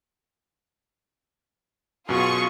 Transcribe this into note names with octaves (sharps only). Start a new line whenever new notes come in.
F#2 B2 F4 G#4 C#6